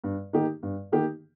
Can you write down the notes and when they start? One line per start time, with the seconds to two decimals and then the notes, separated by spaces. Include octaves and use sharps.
0.04 G2
0.33 D#3 A#3 D#4 G4
0.63 G2
0.92 D#3 A#3 D#4 G4